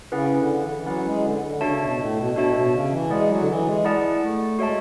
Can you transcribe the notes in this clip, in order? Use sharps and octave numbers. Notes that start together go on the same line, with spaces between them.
C#3 C#4 E4 G#4 B4 F#5
D3
E3
E3
F#3 C#4 E4 G#4 B4 F#5
G#3
D3
D3
C#3 D4 F#4 C#5 E5 A5
B2
A2
B2
B2 D4 F#4 C#5 E5 A5
A2
B2
C#3
E3
G#3 E4 G#4 D5 F#5 A5
F#3
D3
E3
G#3
E4 G#4 D5 F#5 A5
A3
G#3 F#4 C#5 E5 A5